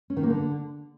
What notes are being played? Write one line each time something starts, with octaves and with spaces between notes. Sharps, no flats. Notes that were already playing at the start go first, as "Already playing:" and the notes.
C#4
D#3
A#3
D3